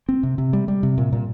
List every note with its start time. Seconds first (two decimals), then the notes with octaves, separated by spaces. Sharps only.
0.09 C4
0.23 C3
0.38 C3
0.53 G3
0.68 G3
0.83 C3
0.98 A#2
1.12 A#2